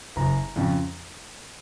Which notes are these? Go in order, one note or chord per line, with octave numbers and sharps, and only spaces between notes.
F#1 A#5
F2 C#3